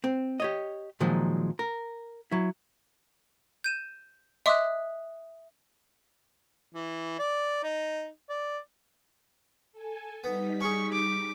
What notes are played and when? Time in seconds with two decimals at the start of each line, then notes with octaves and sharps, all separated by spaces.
0.04 C4
0.40 G4 C#5 D#5
1.00 A#2 D#3 F3 F#3 G#3
1.59 A#4
2.31 F#3 E4
3.64 G6 D#7 E7
4.46 D#5 E5 C6 D6 D#6 F#6
6.74 E3
7.19 D5
7.63 D#4
8.29 D5
9.72 A4 G#5
10.24 G3 B3 D#4 B6
10.61 C#4 G#4 C#6
10.92 D6